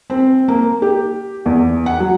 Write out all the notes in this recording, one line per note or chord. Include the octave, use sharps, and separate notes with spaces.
C4
A#3
G4
E2
F#5
F#3